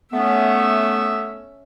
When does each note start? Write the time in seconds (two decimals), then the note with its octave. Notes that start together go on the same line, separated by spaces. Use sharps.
0.13 A3 B3 C#4 E5